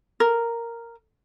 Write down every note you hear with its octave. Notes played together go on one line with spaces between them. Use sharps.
A#4